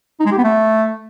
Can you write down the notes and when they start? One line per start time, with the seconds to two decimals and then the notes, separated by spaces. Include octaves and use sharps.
0.20 D#4
0.26 G#3
0.32 G4
0.38 B3
0.44 A3